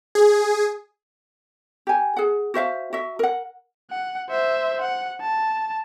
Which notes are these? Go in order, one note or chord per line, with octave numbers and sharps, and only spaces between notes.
G#4
G4 G#5
G#4 F#5
F#4 C5 E5 F5
F#4 E5
A#4 F#5
F#5
C5 E5
F#5
A5